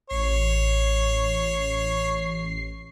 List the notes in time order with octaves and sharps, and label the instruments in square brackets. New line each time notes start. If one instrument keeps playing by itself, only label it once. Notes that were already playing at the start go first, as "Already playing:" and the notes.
[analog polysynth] A1 C7 [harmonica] C#5